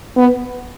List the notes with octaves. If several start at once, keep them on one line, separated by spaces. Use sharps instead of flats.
B3